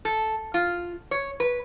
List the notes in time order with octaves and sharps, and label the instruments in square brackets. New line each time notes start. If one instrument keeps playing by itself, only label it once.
[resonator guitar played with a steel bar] A4
F4
C#5
B4